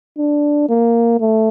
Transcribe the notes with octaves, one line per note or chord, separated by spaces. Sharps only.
D4
A#3
A3